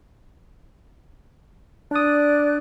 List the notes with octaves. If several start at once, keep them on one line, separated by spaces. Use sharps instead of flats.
D4 D5 D#6 F#6